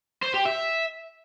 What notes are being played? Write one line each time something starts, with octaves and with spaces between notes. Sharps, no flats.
C5
G4
E5